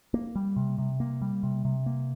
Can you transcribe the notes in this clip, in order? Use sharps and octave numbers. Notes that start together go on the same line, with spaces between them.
A#3
G3
C3
C3
A#3
G3
C3
C3
A#3